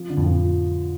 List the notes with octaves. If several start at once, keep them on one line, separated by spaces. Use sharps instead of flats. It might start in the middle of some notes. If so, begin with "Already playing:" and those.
Already playing: F3
D3
F2 A2
F3